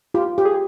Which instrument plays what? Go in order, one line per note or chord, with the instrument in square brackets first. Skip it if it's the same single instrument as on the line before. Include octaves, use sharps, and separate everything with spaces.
[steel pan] F4 [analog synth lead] G4
[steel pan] G4
[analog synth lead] G#4